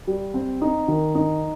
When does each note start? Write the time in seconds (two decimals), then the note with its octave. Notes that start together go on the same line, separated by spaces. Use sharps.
0.07 G3
0.34 C4
0.62 D#4
0.88 D#3
1.15 D#4